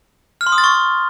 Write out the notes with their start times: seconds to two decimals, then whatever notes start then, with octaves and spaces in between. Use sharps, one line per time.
0.41 F6
0.47 C6
0.52 D#6
0.58 A6
0.64 C#6